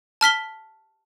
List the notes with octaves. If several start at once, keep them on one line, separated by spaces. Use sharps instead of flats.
A5 F6 B6 G7